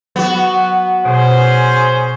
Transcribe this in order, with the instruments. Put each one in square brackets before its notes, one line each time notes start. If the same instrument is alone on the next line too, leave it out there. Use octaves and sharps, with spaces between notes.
[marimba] F#3 [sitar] B3 F#4
[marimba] B2 [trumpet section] C#4 G#4 C5